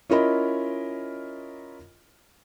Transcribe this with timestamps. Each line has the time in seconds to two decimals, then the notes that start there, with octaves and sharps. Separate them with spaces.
0.10 C#4 E4 F4 A#4 D#5 B5